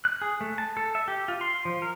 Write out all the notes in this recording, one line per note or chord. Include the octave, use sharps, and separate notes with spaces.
F#6
G#4
A3
A5
A4
E5
G4
F4
C6
F3
A#4